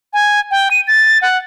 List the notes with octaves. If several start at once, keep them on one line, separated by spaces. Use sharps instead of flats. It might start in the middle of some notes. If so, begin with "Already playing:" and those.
G#5
G5
D#7
A6
F#5